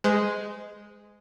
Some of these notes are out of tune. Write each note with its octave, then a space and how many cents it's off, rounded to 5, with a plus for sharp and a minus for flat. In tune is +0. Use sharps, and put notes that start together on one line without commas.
G#3 +0 C5 -45